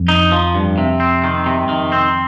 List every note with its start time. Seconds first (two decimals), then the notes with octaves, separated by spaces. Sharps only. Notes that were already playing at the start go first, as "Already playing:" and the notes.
Already playing: F2
0.08 D#4
0.32 F3
0.55 G2
0.78 C3
1.00 C4
1.24 D#3
1.46 C3
1.64 G2
1.69 F2 D#3
1.92 C4